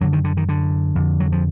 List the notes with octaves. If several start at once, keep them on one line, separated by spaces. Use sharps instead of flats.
F#2 D3 F#3
D#3
D3
D#3
D3
F2 D3
F#3
F3